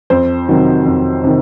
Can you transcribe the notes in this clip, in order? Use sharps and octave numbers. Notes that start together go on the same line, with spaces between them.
F2 C5
C3 D#3 F#3
F2
C3 D#3